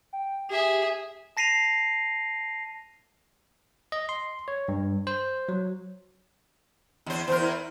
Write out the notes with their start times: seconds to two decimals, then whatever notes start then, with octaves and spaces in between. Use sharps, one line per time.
0.13 G5
0.50 G4 G#4 E5
1.37 A5 A#6 C7 D#7 F7
3.92 D#5
4.09 C6
4.48 C#5
4.68 G2
5.07 C5
5.49 F#3
7.06 E2 C5
7.28 E2 A#4 C5
7.41 E4